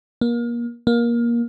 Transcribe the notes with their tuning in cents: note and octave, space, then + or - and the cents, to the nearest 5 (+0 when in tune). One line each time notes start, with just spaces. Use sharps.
A#3 +30
A#3 +20